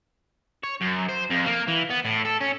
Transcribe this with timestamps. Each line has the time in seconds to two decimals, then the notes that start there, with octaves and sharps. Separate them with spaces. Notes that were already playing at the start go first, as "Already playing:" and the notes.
0.63 C#5
0.81 F#2
1.09 C5
1.31 F2
1.46 A#3
1.68 E3
1.90 B3
2.05 A2
2.25 A4
2.41 C#4